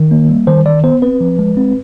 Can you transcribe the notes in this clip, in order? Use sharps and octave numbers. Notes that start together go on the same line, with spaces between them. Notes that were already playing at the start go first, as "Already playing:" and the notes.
Already playing: D#3
A#3
G3
D#3 C5
D#3 D5
B3 C5
C4 B4
F3
G#3
C4